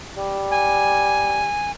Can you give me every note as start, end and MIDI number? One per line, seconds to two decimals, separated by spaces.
0.17 1.48 55
0.51 1.71 80